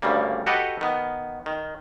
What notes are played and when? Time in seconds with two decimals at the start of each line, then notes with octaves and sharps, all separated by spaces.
0.02 D2 G2 C#3 G3 A#3
0.46 F#4 G4 A4 B4 D#5 F#5
0.81 D#3 B3
1.46 D#3